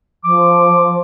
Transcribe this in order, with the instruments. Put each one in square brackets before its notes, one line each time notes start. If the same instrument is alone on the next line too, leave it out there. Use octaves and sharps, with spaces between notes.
[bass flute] F3 [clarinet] D6